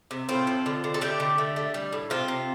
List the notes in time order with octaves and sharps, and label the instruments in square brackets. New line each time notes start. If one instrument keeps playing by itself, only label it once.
[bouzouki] C3
A2 C4 F4
F3
D3
D3
A4
A3 D4 G4
D3
A3
A3
G3
A2
C3 C4 F4
C3